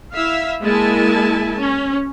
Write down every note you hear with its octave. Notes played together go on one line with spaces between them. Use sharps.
E4 E5 F5
G#3 A#3 E4 G#5 A5
C#4